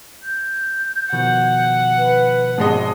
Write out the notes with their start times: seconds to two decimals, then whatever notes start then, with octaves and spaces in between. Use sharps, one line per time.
0.23 G6
1.13 B2 D#3 F3 F#5
1.97 B4
2.58 G#1 G#3 D#5 A5